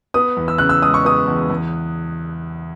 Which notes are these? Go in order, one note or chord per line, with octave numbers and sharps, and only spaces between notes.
B3 D#6
E2
E6
C#3 F#6
E6
G#3 D#6
C#6
B3 D#6
E2
E2